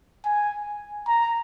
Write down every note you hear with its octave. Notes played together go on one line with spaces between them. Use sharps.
G#5
A#5